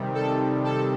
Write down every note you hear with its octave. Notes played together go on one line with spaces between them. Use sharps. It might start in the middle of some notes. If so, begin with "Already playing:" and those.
Already playing: C3 D#3 G3
A4
A4